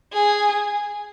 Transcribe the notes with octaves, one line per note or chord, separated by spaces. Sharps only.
G#4